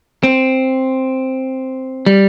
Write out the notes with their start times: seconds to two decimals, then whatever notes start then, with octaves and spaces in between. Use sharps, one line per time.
0.23 C4
2.06 G3